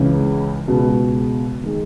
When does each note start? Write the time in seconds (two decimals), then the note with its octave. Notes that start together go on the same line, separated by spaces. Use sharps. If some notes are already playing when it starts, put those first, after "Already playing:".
Already playing: C#2 C#3 E3 G#3
0.67 C#2 B2 G#3
1.63 D#3 G#3